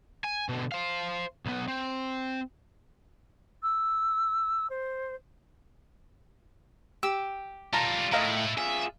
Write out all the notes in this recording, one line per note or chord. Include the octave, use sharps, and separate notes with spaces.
G#5
B2 D3
C5 F5
B1 B3
C4
E6
C5
G4 E6
G3 F4 A#4 A5 A#5
A2 A3 E4 D#5 F5 A#5
F4 G#4 E5